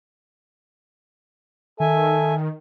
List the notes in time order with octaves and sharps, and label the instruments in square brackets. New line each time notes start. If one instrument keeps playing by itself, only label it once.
[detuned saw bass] D#3 [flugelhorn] A4 [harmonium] E5 G#5